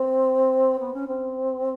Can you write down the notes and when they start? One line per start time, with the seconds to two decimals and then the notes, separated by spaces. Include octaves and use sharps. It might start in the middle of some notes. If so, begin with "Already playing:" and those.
Already playing: C4
0.79 B3
0.93 C#4
1.07 C4